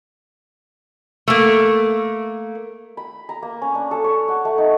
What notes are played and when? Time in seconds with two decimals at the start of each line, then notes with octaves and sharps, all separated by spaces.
1.28 A3 A#3
2.97 B5
3.29 A#5
3.42 A#3
3.62 C#4
3.75 D4
3.91 A4
4.04 C#5
4.28 F#5
4.45 A3
4.58 D#4